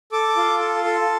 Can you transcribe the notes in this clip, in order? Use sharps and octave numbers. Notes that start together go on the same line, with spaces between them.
A4 D6
F4
A4
A4